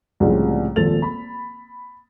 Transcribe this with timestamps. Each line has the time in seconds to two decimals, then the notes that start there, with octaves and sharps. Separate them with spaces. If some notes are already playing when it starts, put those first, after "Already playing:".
0.20 C2 A2 C#3 F3 G3 G#3
0.76 D#1 G#1 F3 A4 A6 F7
1.02 B5